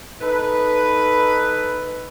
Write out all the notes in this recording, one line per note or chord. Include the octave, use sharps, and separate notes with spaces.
D#4 A4 B4